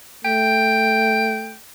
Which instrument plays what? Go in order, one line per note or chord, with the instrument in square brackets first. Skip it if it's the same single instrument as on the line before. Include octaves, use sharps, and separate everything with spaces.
[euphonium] A3 [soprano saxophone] G5